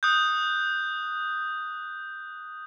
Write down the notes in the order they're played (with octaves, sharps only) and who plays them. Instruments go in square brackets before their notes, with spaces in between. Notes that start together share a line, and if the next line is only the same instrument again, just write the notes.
[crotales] D#6 F#6 G6